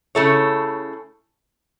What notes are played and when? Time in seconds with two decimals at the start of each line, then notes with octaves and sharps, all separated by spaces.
0.15 C#3 A3 E4 A4 C#5